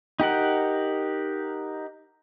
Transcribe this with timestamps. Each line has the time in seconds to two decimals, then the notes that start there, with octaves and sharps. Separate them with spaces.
0.20 D#4 G4 A#4 F#5